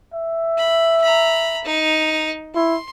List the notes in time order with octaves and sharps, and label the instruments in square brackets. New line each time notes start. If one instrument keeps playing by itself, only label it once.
[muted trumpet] E5
[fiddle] B5
A#5 B5
D#4
[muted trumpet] E4 [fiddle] C6